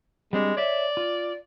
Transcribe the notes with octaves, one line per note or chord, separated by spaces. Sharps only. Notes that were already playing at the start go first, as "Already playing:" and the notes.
G3 G#3 C4 D4
C#5 D5 E5
F4